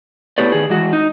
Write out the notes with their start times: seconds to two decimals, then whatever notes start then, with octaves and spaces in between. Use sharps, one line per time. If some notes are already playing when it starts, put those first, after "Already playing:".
0.38 A2 B3 G4 B4 C#5 D5
0.52 D#3 G#4
0.70 E3 G#3 F#4
0.93 D#4